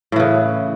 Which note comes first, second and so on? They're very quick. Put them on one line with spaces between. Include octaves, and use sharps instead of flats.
A2 E3 C#3